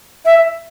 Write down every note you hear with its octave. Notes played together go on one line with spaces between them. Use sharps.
E5